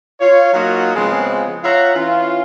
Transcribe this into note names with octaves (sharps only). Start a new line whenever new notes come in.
F4 C#5
F#3 A#3 D#4 F4 F#4
C#3 F3 G#3 B3 C4
F4 C#5 E5 F#5 A#5
E3 C#4 F4